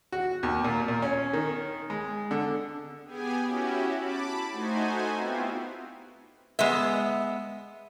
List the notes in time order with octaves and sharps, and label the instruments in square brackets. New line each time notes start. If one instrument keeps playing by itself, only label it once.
[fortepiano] F#4
D#2
A#2
A#2
C#4
D#3
G#3
D3
[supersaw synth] B3 G4 G#4 G#5
C#4 E4 F#4 G4
A5 B5 D6
A3 D#4 F#4 C5 G#5
B3 C4 E4 F4 G4
[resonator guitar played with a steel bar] G#3 B3 E5